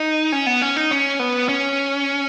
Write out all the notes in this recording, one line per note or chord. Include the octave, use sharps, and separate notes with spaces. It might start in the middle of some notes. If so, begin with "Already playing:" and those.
Already playing: D#4
C#4
B3
C#4
D#4
C#4
B3
C#4